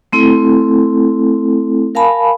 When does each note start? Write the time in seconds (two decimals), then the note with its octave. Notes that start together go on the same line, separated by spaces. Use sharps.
0.12 A3 C4 E4 A4
1.95 A#4 F5 G#5 A5 B5